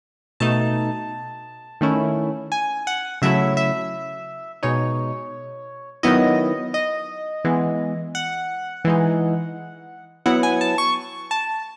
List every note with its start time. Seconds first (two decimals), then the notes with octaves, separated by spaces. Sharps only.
0.40 B2 A3 D#4 A5
1.81 D#3 A3 C#4 E4
2.52 G#5
2.87 F#5
3.22 C#3 F#3 A3 E4 E5
3.57 E5
4.63 B2 G#3 D#4 C#5
6.03 D#3 F#3 B3 E4 D#5
6.74 D#5
7.44 E3 G#3 B3
8.15 F#5
8.85 E3 G#3 D#4
10.26 F#3 B3 E4 F#5
10.43 G#5
10.61 A5
10.78 C#6
11.31 A5